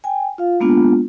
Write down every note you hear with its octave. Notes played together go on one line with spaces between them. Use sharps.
G5 G#5
F4 F5
G#3 A#3 B3 D4 F4